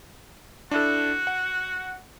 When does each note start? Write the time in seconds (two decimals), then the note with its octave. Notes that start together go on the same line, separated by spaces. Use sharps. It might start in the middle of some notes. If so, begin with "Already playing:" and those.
0.71 D4 E4 F#4 A4
1.27 F#5